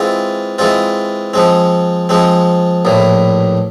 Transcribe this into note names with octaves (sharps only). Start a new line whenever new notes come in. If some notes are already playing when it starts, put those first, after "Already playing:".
Already playing: E3 G#3 C4 F4
E3 G#3 C4 F4
F3 G#3 C4
F3 G#3 C4
A#1 A2 E3